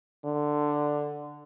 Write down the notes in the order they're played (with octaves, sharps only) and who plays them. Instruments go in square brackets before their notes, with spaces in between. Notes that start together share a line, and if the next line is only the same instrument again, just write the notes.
[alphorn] D3